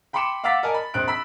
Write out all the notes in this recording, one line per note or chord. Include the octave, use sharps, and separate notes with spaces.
G5 B5 C6 D6 C#7 E7
F5 F#5 D6 E6 A6 B6
A#4 D5 D#5 G#5 A5
B5
A#1 C4 F#6 D7
B5 E6 B6